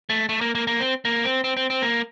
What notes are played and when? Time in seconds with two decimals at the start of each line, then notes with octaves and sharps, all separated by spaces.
0.10 A3
0.29 A3
0.41 A#3
0.55 A#3
0.67 A#3
0.80 C4
1.05 A#3
1.25 C4
1.44 C4
1.57 C4
1.70 C4
1.82 A#3